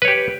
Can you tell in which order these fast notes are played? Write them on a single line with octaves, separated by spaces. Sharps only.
B4 C#5 G4